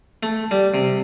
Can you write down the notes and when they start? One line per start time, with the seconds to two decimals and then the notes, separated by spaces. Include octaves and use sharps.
0.23 A3
0.51 G3
0.74 C3